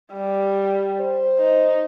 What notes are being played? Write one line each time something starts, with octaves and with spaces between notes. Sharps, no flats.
G3
C5
D#4